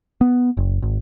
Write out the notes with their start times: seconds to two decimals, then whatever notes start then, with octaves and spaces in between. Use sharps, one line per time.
0.21 B3
0.57 F#1
0.82 G#1